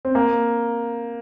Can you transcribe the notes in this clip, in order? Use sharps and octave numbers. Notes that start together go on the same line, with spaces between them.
C4
A#3